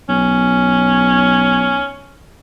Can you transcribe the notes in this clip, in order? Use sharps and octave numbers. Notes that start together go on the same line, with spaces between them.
B1 C#4